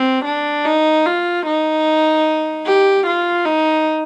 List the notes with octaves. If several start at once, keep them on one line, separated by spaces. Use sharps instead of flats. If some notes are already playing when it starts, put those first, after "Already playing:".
Already playing: C4
D4
D#4
F4
D#4
G4
F4
D#4